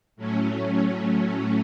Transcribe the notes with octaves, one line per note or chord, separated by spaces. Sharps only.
A2 F#3 A3 C#4